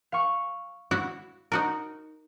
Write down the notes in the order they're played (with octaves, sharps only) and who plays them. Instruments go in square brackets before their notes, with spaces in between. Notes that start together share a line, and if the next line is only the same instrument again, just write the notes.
[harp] F5 C#6
[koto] E4 F#4
D#4 F#4 A#4